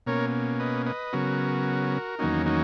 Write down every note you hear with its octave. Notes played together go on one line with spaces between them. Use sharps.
B2 A#3 C#4 A#4 C#5
B4 D#5
B4 D#5
C#3 F#3 B3 F#4 A#4
E2 D#3 F#3 A#3 C#4 D#4 F#4
D#4 F#4